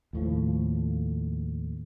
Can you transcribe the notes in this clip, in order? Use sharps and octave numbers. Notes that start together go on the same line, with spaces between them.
D#2 A2 F3